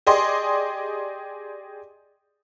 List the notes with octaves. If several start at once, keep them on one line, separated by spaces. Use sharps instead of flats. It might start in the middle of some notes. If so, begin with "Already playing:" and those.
G4 G#4 D5 D#5 C6